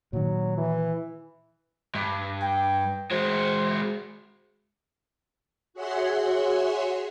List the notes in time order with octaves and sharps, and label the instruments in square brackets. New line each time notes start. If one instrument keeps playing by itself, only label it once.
[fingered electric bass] A#2 D#3 [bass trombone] F#3
[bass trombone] E3
[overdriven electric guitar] G2
[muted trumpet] G5
[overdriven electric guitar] G#3 F#4 [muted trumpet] C5
[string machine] F#4 G#4 C#5 E5 F#5 C6